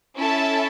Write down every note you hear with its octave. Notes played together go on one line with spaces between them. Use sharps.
C#4 E4 A4 E5 A5